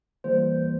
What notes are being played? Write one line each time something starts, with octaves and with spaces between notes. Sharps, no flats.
E3 G3 A#3 C5